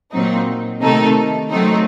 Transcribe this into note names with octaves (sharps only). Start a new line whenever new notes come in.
A#2 F#3 C4 D#4
C3 D#3 A3 D#4 A4
D#3 F#3 A3 C4 D#4